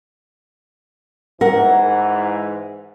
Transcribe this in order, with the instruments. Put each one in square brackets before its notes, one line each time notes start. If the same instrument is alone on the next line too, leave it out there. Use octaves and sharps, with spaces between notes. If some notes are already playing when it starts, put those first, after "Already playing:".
[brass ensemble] G#2 E3 [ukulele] A#4 [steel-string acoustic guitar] F#5